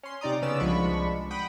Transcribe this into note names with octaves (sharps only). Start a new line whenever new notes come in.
C#4 C6
C3 D#4 D5 A#5 D#6
C#3 B3 C#4 D5 E6
C2 F3 G#3 D4 B5 C#6
F#5 G5 B5 D#6